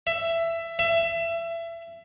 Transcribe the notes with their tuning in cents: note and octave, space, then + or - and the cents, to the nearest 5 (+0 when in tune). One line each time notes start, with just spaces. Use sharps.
E5 +15
E5 +25